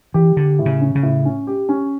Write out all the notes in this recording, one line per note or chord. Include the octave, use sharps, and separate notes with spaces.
E3 G4
D3 G4
A2
C#3
C#4
C#3
A2
C#4
G4
C#4